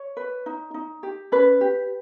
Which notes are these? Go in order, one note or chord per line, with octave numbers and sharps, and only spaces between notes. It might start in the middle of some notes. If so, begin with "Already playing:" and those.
Already playing: C#5
B4
D#4
D#4
G4
C#4 B4
G4